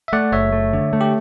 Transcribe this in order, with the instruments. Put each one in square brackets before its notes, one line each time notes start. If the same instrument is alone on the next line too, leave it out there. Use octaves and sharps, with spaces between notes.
[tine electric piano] E5
[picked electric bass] A3 [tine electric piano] D5 F#5
[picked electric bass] F#1 [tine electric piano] C#5 E5
[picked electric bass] A3
D3
A3
[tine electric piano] G4